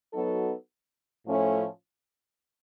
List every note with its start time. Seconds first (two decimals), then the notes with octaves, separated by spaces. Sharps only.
0.14 F#3 B3 D#4 F#4 A4
1.26 A2 F3 A3 C#4 E4